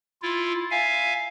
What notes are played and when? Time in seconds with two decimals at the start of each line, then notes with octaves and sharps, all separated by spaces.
0.22 E4 F4
0.71 E5 F5 G#5